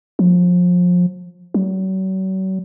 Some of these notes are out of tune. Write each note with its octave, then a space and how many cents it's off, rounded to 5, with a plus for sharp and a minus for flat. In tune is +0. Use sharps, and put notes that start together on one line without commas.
F3 +30
F#3 +40